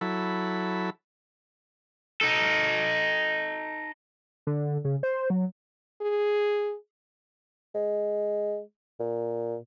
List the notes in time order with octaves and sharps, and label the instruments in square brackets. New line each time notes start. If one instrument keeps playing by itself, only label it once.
[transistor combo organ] F#3 E4 A4 B5
[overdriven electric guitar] D#4 A4
[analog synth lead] D3
C#3
C5
F#3
[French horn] G#4
[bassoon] G#3
A#2